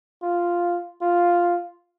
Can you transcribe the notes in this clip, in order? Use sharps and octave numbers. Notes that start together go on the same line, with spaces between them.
F4
F4